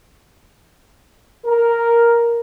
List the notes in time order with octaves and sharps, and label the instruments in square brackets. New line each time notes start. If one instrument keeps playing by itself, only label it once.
[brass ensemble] A#4